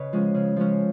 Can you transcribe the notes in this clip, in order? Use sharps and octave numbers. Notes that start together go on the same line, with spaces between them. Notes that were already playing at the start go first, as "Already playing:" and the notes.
Already playing: C#3 B4 C#5 D#5
F3 G#3 C#4
C#3
F3 G#3 C#4